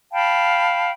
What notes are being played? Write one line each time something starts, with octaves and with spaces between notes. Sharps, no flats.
F5 G5 A5 B5